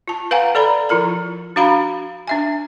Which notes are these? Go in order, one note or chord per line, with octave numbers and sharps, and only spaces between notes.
F4 A5
B4 F5 F#5 G#5 A#5
A4 D5 A#5 B5
F3 E4 F4 A#4 A#5
D4 F#4 F5 A#5 B5
D4 E5 G#5